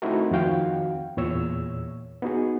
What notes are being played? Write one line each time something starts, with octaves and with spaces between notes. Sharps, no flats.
A3 C4 D#4 E4 F#4 A#4
F2 D#3 C4 F#4 F5 G5
E2 A#2 C#5 E6
B3 D#4 F#4 G#4